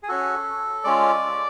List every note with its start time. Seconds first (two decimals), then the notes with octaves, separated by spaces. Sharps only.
0.03 G#4
0.08 C#4 F#4 A4
0.84 G#3 C#4 F4 D5